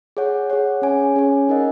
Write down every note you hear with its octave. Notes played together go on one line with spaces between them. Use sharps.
G#4 C#5 F#5
G#4 C#5 F#5
C#4 G#4 C#5 G#5
C#4 G#4 C#5 G#5
D#4 A#4 D#5 F#5